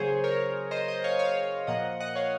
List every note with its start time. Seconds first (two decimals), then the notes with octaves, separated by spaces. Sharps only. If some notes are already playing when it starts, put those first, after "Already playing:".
Already playing: C#3 F#3 A#3 G#4 C5 C#5
0.24 A#4 C#5
0.71 C5 D#5
0.88 C5 D#5
1.04 C#5 F5
1.19 C#5 F5
1.67 A#2 F3 A#3 D#5 F#5
2.00 D#5 F#5
2.16 C#5 F5